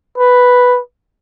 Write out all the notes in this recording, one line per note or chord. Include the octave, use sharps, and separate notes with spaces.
B4